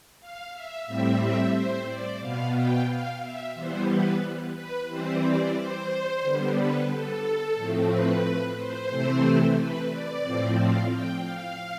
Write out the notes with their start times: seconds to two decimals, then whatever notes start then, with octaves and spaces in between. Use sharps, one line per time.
0.20 F5
0.53 E5
0.87 A2 G3 C4 E5
1.20 E5
1.54 C5
1.87 D5
2.20 B2 B3 F5
2.54 G5
2.88 F5
3.21 E5
3.54 E3 G3 B3 C5
3.88 B4
4.54 B4
4.88 E3 G3 C4 C5
5.22 D5
5.55 C5
6.22 D3 G3 B3
6.55 B4
6.89 A4
7.55 A2 F3 A3 C4
7.88 B4
8.56 C5
8.90 C3 E3 A3 C4
9.56 B4
9.89 D5
10.23 A2 F3 C4
10.56 F5
10.90 G5
11.23 F5